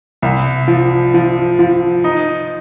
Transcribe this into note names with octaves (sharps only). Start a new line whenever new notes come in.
C2
F3
F3
F3
D#4